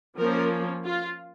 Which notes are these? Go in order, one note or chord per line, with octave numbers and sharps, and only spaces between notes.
F3 A#3 C#4 A#4
F4